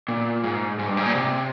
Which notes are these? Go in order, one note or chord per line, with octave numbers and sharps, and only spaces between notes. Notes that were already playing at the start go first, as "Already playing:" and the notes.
A#2
G#2
G#2
G2
G#2
A#2
C3